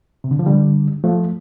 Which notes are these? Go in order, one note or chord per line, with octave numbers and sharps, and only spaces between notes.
C3
D3
F3
D3 G3
F3 A3